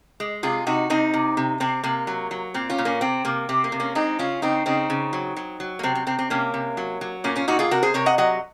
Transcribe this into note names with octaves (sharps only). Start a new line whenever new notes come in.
G#3
C3 F4 G#4
C3 D#4 F#4
C3 C4 D#4
C3
C3
C3 C4
C3 A#3
F#3
F#3
A#2 C4
C#4 F4
A#2
A#3 C#4
C3 C4
C3 A#3
C3 C4
A#3
C3
A#3 C#4
G#3 C4 D#4
C#3 C#4 F4
C#3 C4 D#4
C#3 C4 D#4
C#3
F#3
F#3
F#3
A#3
C3 C4
C4
C3 C4
C4
C3 A#3 C#4
C3
F#3
F#3
A#2 A#3 C#4
C#4 F4
A#2 D#4 F#4
F4 G#4
C3 F#4 A#4
G#4 C5
C3 A#4 C#5
D#5 F#5
F#3 D#5 F#5